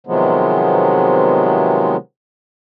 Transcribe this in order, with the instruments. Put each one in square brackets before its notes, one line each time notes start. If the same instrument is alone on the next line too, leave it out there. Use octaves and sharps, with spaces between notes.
[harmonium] C3 D#3 F3 F#3 G#3 B3